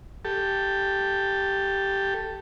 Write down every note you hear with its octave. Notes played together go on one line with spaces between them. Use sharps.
G4 A4